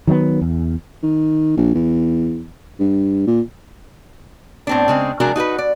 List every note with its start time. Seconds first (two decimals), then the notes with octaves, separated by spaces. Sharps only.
0.07 D#3 F#3 G#3 B3
0.42 E2
1.03 D#3
1.57 A#1
1.74 E2
2.80 G2
3.27 A#2
4.67 A2 C4 D4
4.88 C#3 G#3 C4
5.20 C3 F3 G#3 D4 F#4 A#4
5.36 D#4 F#4 A#4 B4
5.58 D5